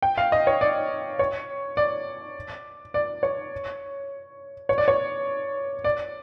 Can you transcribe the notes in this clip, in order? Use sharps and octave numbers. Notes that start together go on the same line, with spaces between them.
G5
F5
D#5
C#5
D5
C#5
D5
D5
C#5
C#5
D5
C#5
D5